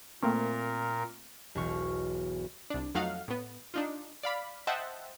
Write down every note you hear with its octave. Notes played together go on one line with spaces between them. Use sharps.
A#2 A3 A#3 C4 A#4
E1 B1 C#6 F6
C2 D4
F2 F#3 A3 D#4 F5 F#5
A2 B3
D4 D#4 F4
D5 F5 B5
C5 D#5 E5 F#5 G5 A5